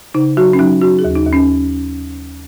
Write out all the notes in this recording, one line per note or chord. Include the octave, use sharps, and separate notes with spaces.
C#3 D#4
F#3 F#4
C#4
F#3 D#4
F#3 F#4
G#4
D#2
D#4
D#2
C#4